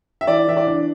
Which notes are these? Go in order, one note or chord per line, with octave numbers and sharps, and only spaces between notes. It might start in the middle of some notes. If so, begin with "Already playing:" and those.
E5
E3 D5
E3 E5
D5
D4